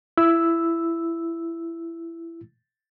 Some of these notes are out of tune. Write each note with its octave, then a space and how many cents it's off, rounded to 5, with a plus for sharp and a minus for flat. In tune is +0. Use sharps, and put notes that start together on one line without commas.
E4 +20 E6 +0